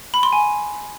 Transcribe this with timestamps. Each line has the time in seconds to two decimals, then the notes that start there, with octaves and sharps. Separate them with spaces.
0.14 B5
0.23 C6
0.33 G#5